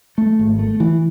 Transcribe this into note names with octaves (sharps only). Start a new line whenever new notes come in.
A3
G#1
A3
E3